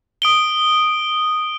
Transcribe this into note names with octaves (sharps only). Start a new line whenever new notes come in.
D#6 D7 G7